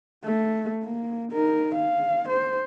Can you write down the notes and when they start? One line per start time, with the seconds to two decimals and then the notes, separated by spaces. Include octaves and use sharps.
0.25 A3
0.83 A#3
1.32 D#4 A#4
1.75 F5
2.29 C5